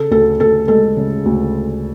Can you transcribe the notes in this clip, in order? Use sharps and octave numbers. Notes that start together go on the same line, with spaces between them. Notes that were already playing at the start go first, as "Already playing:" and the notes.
Already playing: C#3 A4
D2 A4
D2 A4
G#3 A4
C#3
D2